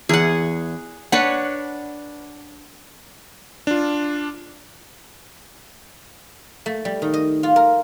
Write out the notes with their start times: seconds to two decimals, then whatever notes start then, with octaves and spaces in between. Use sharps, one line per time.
0.09 E2 G#4 F#5
1.12 D4 B4 C#5 F#5
3.67 D4 F4
6.66 A3
6.85 G3
7.02 D#3
7.14 D#5
7.43 F4
7.56 A#4